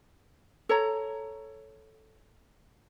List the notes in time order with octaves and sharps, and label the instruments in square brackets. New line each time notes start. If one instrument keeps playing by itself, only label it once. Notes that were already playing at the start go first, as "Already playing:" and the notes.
[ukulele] A4 C#5 A#5